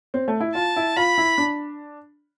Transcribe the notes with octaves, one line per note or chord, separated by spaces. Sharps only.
C4
A3
E4
F4 A5
E4
F4 B5
E4
D4